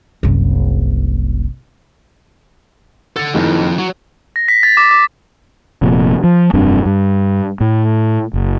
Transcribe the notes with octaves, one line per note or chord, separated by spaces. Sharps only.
F#1 C2
A4 F#5 A6
F#1 F2 D#3 E3
F#3 F#4
A#6
B6
A6
D6
D6
F1 F2 A#2
F3
F1 G2 C4 D4
G2
A2
F#1